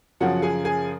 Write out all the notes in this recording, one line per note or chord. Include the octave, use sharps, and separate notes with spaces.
F#2 C#3 F3 F#4 F#5
G#4 G#5
G#4 G#5